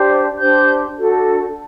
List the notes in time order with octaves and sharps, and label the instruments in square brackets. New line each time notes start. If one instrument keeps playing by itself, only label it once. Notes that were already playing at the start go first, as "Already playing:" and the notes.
Already playing: [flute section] D4 G4 C5
D4 G4 C5 G6
D4 F#4 A4